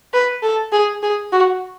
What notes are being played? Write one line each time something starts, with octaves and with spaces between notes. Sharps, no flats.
B4
A4
G#4
G#4
F#4